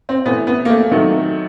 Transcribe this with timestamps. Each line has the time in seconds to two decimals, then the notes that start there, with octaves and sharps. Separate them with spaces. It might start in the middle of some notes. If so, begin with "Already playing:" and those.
0.09 C4
0.25 C3 E3 A3 B3
0.47 B3
0.65 A#3
0.70 A3
0.91 C3 D#3 F#3 A3